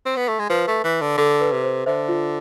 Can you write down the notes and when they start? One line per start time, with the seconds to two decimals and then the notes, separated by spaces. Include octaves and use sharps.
0.06 C4
0.16 B3
0.28 A3
0.39 G#3
0.49 F3 B4
0.68 A3
0.84 E3
1.01 D3
1.17 D3 A4
1.41 B4
1.52 C3
1.64 C5
1.86 D3 C5 E5
2.09 F4